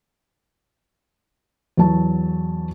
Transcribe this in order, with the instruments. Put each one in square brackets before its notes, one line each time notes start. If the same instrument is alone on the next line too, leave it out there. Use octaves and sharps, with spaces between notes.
[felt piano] E2 F#3 A5